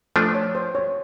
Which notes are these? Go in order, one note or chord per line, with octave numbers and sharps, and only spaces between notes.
F3 A3 D4 C5
C#5
C5
C#5